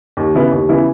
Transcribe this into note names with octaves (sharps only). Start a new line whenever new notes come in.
D#2
C#3 E3 B3 E4
D#2
C#3 E3 B3 E4